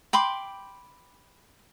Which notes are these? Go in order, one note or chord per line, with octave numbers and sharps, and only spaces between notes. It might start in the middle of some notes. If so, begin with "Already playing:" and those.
G5 B5 C6 D6